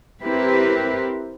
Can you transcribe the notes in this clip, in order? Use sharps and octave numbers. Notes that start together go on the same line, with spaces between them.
C4 E4 G4 A#4 B4